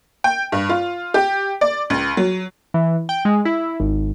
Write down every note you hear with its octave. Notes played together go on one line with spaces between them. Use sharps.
G5
G2
F4
G4
D5
C#2
F#3
E3
G5
G#3
E4
G#1